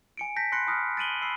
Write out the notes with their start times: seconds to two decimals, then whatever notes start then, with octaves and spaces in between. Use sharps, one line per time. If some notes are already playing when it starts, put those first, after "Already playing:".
0.17 G#5 C#7 D7
0.36 A5 G6 A#6 B6
0.52 B5 C6 F#6 A#6 C7 C#7
0.67 A5 B5 D#6 F6 F#6 A#6
0.97 A6 D7 D#7 F#7 G7
1.22 B5 E6 C7